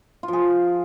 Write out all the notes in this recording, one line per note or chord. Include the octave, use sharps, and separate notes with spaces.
F4
F3
G#4